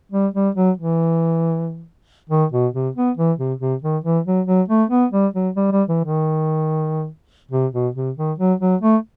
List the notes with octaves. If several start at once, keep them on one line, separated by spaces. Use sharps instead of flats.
G3
G3
F#3
E3
D#3
B2
C3
B3
E3
C3
C3
D#3
E3
F#3
F#3
A3
B3
G3
F#3
G3
G3
E3
D#3
C3
B2
C3
D#3
F#3
F#3
A3